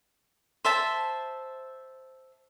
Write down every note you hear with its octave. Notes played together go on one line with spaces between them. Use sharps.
C5 E5 A5